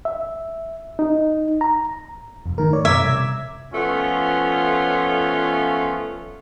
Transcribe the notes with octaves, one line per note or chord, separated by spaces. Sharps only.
E5
D#4
A#5
F1 E2
G#2 D#3 A3 A#4
C#5 D5
F#2 B2 E5 A#5 D6 G#6
C3 G3
F3 A3 B3 C#4 F4